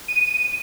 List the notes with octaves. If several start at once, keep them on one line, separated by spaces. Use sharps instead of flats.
D#7